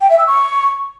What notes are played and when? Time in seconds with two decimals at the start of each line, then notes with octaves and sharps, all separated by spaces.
0.01 G5
0.10 E5
0.18 E6
0.27 C#6